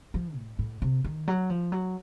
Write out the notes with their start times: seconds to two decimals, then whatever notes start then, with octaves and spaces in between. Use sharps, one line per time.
0.14 F3
0.36 A2
0.59 A2
0.82 C3
1.04 D#3
1.28 F#3
1.50 F3
1.72 F#3